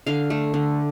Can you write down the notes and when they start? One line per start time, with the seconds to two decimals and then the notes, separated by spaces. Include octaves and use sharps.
0.07 D3 F5
0.30 A3
0.54 D3